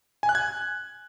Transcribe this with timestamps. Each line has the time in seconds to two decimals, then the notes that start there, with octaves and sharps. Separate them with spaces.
0.23 G#5
0.29 F#6
0.35 G#6